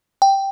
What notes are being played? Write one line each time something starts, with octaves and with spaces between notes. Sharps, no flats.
G5